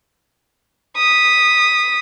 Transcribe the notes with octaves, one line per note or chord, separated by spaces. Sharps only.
D#6 B6